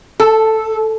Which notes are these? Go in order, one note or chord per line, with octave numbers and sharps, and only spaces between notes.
A4